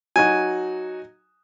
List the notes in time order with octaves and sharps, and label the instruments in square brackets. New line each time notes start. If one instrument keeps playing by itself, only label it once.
[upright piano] F#3 D#4 F#4 [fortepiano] G#5